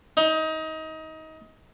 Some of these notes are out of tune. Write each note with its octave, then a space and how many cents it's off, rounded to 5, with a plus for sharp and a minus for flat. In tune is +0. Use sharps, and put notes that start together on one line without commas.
D#4 +25